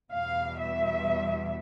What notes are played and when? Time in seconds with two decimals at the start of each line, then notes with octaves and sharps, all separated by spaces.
0.12 E2 B2 G3 F5
0.59 E5